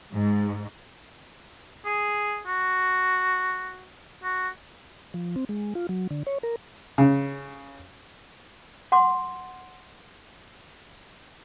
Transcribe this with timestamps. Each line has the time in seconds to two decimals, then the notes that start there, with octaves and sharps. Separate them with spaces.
0.12 G#2
1.86 G#4
2.47 F#4
4.24 F#4
5.14 F3
5.36 C4
5.49 G#3
5.75 F4
5.89 F#3
6.11 D3
6.27 C#5
6.43 A#4
6.98 C#3
8.92 F#5 C6 D6